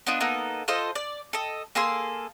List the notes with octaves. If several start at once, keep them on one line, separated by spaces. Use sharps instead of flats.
B3 D4 D#4 F4
A#3 B3 D#4 A4
F4 A4 C5 D#5
D5
A4 D#5
A#3 G#4 A4 C6